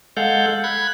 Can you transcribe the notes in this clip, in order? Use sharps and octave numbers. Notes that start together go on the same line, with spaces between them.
G#3 A4 F5 F#5 G6
B5 F#6 G#6